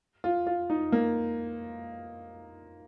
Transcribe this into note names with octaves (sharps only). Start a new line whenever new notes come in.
F4
F4
D#4
A#3